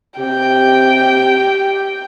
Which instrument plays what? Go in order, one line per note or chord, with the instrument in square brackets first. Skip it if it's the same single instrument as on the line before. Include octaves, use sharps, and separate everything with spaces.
[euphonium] C3 [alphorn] G4 [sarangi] G5